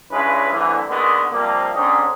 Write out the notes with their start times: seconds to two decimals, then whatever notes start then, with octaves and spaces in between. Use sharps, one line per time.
0.12 C#2 G2 G#3 C#4 E4 B4
0.53 C2 A2 D3 E3
0.90 D3 D#3 G#3 A#3 B3
1.32 C3 F3 G3 A#3
1.75 G#2 D3 C4 C#4 D#4 G4